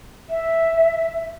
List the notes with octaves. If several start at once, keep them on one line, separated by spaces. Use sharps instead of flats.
E5